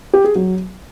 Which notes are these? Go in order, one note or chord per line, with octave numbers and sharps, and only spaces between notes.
G4
G#4
F#3